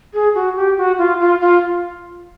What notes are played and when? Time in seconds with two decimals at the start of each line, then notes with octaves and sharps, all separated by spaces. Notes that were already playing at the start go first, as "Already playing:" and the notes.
0.14 G#4
0.35 F#4
0.56 G4
0.77 F#4
0.98 F4
1.20 F4
1.40 F4